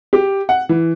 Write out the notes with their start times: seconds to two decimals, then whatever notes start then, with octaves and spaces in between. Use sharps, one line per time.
0.13 G4
0.49 F#5
0.69 E3